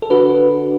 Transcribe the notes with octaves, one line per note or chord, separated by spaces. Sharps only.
A4
D3 F#4 B4